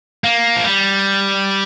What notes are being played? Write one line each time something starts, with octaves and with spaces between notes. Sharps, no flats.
A#3
F3
G3